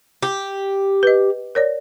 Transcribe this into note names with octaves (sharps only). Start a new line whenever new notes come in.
G4
B4 D#5
A#4 C#5 D5